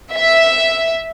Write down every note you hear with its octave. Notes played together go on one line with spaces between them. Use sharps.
E5